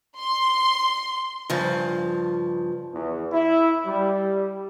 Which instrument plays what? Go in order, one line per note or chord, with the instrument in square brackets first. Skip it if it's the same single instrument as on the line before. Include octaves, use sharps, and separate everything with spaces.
[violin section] C6
[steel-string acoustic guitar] G2 C#3 F3
[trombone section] E2
E4
G3